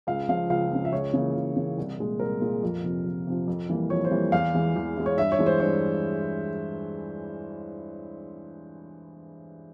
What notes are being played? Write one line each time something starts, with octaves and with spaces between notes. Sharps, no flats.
C#2 F5
C#3 F3 F5
C#2 F5
C#3 F3
E5
C#2 C#5
C#3 E3 A#3
C#2
C#3 E3 A#3
C2
A#2 G#3
C2 A#4
A#2 G#3
F2
C3 F3
F2
C3 F3
F2
E3 G3 A#3
F2 C#5
C5
E3 G3 A#3
E2 F5
E3 G#3
E2
E3 G#3
C#5
G2 E5
C#5
E3 G#3
C5
G2 C#5